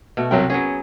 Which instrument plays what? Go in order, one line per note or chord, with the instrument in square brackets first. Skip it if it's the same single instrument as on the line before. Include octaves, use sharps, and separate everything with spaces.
[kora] B2 A3 F#4
[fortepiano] C2 F#3 G5 [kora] A#4
[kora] F#3 B3 G#4 [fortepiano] C#4